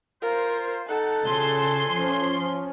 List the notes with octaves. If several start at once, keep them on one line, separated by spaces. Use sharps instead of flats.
F4 A#4 C5
D#4 A4 F#5 A5
D2 A#2 C#3 G#5 C6
F3 C#4